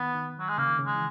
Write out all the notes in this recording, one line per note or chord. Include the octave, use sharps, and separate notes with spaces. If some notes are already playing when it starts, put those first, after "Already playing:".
Already playing: D#3 B3
D#3
F#3
G#3
C#3 A#3
D#3
C#3
G#3
E3